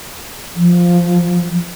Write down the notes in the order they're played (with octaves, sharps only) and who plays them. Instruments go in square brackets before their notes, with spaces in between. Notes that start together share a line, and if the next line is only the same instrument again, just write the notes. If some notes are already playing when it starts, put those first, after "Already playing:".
[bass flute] F3